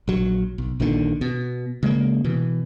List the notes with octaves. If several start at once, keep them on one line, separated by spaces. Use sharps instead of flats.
A#1 F#3
B1
A#1 A#2 D3 D#3
B2
C#3 G#3 A#3
B2 E3